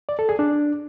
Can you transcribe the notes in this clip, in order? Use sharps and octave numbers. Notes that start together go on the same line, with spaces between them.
D5
A4
G#4
D4